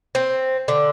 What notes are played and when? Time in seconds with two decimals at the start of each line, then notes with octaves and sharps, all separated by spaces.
0.15 C4
0.68 D3